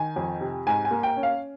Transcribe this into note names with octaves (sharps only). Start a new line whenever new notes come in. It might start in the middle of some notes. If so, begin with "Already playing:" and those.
Already playing: D#3 G#5
F2
C3
G#2 G#5
G#5
A#3
G5
C#4
F5